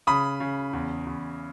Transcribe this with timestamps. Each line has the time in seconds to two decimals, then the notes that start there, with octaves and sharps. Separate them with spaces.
0.07 C#3 B5 D#6
0.40 C#3
0.73 E2
1.07 E2